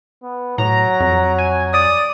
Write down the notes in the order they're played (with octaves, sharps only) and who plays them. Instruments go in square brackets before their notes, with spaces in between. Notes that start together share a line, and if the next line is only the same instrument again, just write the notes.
[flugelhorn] B3
[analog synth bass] A2 [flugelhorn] F#3 [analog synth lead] A#5
[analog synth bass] F2
[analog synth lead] G#5
[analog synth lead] D5 [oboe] D#6